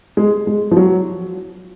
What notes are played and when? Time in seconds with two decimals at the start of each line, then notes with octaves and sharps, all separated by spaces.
0.17 G#3
0.47 G#3
0.71 F3
0.77 F#3